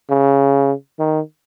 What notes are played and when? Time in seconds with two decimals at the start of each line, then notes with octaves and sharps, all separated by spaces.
0.10 C#3
0.99 D#3